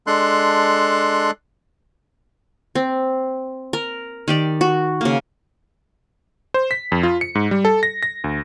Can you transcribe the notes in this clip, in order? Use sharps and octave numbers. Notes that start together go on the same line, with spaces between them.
G#3 D4 A4 C6 F#6
C4
A#4
D#3 G4 D5
F#4
C#3 A#3
C5
B6
F2
F4
C#7
G#2
G3
A4
A#6
A#6
D2